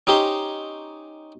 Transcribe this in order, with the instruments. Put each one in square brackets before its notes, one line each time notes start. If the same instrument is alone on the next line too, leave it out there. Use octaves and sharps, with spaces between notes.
[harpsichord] C#4 D#4 G4 C5